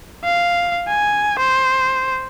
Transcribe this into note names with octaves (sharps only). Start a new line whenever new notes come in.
F5
G#5
C5